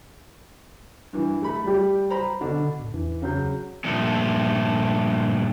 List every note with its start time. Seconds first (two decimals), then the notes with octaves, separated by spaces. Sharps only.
1.13 G2 E3
1.42 A3 B5
1.64 G3 G4
2.10 C5 A#5 B5
2.41 B2 D3 D4 F#4
2.80 A2
2.94 E2 E3
3.22 C#3 F#3 G6
3.84 G2 A#2 F3 A3